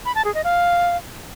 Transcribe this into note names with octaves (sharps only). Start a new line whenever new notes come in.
B5
A5
G#4
D#5
F5